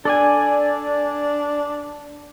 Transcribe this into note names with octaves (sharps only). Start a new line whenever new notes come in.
D4 A4 D5 G#5